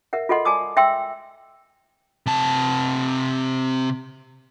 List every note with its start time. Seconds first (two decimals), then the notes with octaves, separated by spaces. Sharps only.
0.13 A#4 E5 F#5
0.29 F4 A4 D#5 F#5 C6
0.45 D5 G#5 A5 D6 D#6
0.77 E5 G5 C6 E6
2.26 C3 A5